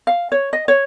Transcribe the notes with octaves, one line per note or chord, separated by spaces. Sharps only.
F5
C#5
D#5
C#5